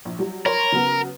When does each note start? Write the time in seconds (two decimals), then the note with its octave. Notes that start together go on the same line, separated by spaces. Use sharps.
0.05 A#1
0.19 F#3 G3
0.46 A#4 C#5 B5 C6
0.72 C#3 F#3 B3